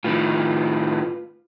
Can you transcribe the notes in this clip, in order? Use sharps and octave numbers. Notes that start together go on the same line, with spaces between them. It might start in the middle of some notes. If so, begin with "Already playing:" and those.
A2 D#3 F4 B4